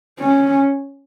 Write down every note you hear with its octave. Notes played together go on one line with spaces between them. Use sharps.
C#4